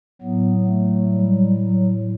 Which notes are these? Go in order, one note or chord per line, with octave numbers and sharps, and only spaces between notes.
A2 F#3 B3
A3
G3
F#3